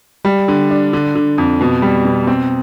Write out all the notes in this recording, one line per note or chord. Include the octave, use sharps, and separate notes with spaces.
G3
D3
D4
D3
D3
F2
B2
G3
B2
C4